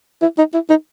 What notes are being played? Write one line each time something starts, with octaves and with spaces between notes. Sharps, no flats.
E4
D#4
E4
D#4